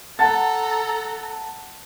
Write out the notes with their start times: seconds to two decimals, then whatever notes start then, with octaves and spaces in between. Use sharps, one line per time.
0.19 A4 F#5 A5 A#5 A6